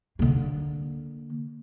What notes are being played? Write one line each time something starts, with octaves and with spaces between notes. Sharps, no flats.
D3 A#3